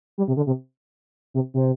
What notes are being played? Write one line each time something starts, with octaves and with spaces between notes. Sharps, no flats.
G3
C3
D3
C3
C3
C3